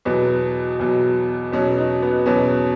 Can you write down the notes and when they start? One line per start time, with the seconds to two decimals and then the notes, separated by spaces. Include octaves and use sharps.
0.05 E2 B2 F#3 B3
0.79 E2 B2 F#3
1.52 E2 B2 F#3 C#4
1.78 D#4
2.02 B3
2.26 E2 B2 F#3 C#4